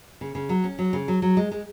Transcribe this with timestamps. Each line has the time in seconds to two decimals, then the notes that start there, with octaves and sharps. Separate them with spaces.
0.21 C#3
0.35 C#3
0.49 F#3
0.64 C#4
0.79 F#3
0.93 C#3
1.08 F#3
1.22 F#3
1.37 G#3
1.51 G#3